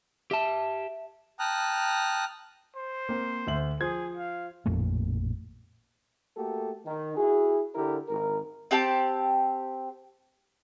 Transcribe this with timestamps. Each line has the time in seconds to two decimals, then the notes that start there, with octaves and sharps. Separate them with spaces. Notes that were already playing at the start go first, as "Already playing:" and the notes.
0.31 G4 E5 A5
1.39 G5 A5 A#5 D#6 F6 F#6
2.76 C5
3.09 A#3 C4
3.47 D2 E5 F#7
3.81 F3 G#4 C5 G#6
4.17 F5
4.66 A1 F2 A#2 A3
6.37 A3 A#3 F#4 G4 A4
6.86 D#3
7.17 E4 F#4 G#4
7.75 D3 E4 G4 A#4
8.09 G#1 A#4
8.71 C4 G4 G5 A5